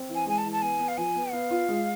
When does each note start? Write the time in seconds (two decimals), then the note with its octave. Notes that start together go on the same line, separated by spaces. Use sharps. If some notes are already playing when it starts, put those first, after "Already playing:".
Already playing: C4
0.09 E3
0.15 G#5
0.26 G#3 G#5
0.38 A5
0.45 E3
0.52 A5
0.62 B3 G#5
0.80 B3
0.88 F5
0.97 F3 G#5
1.15 B3
1.32 B3 F5
1.51 F4
1.69 G#3